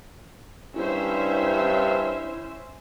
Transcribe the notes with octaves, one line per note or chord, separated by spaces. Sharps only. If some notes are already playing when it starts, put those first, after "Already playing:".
G2 C#4 E4 C5 E5